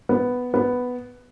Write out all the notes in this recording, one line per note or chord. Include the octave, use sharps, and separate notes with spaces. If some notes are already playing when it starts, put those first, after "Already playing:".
B3
B3